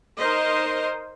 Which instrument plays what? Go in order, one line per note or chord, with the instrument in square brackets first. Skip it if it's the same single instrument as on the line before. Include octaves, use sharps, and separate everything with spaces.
[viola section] D#4 A#4 C5 D#5